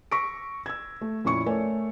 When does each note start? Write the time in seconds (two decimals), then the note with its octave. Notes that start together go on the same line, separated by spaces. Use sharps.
0.12 C#6 E6 A#6 B6 D7
0.66 E6 G#6
1.01 A3
1.25 F2 A#2 C#4 E4 C#6 C#7
1.46 A3 A#4 C#5 D5 G#5